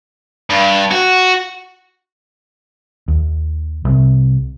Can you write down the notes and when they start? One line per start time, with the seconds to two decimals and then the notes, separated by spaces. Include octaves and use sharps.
0.50 G2
0.91 F#4
3.08 D#2
3.85 C2 C3